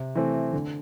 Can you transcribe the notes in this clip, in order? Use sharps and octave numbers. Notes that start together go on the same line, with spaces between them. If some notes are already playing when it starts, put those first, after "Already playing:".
Already playing: C3
E3 A3 C4
D3